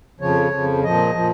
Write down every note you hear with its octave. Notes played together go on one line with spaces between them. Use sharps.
F2 C#3 F3 C#5
F2 C#3 F3
A#2 F3 D#5
A#2 F3